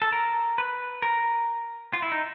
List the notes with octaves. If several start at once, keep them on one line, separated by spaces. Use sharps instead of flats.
A4
A#4
B4
A#4
F4
E4
D#4